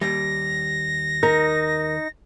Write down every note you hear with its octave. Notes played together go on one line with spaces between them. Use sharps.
D#2 G3 A#6
D#4 A#4